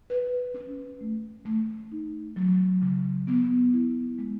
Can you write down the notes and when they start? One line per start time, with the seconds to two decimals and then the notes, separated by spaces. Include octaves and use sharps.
0.10 B4
0.54 C#4
1.01 A3
1.45 A3
1.92 D#4
2.36 F#3
2.82 C#3
3.27 B3
3.73 E4
4.18 G#3